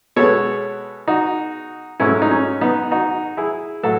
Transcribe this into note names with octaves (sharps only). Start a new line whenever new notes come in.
B2 G#3 B3 A4 C#5
D#4 F#4
G#2 F#3 A3 C#4 E4
D#4
C#4
B3 D#4
D#4 F#4
E4 G#4
A2 F#3 F#4 A4